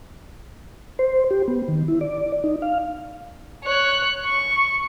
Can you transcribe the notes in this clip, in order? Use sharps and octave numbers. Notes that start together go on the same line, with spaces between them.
C5
G4
B3
D#3
E4
D5
D#4
F5
C#5 F#6
C#6